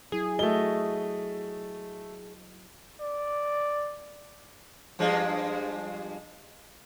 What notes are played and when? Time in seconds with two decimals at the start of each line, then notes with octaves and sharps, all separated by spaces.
0.12 F#3 E4 G#4
0.39 F#3 A3 F#4 D#5 G7
3.00 D5
4.99 G2 F3 G#3